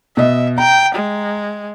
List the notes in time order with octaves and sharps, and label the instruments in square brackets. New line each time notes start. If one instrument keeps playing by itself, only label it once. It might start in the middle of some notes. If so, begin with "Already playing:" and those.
[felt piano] B2 D#5 [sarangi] E5
[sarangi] G5 [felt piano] A#5
[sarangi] G#3